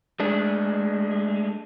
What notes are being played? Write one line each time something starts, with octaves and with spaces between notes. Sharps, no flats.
G#3 A3 D4